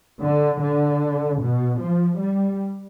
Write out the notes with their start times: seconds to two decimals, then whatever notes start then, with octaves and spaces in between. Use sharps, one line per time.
0.21 D3
0.60 D3
1.39 B2
1.79 F3
2.19 G3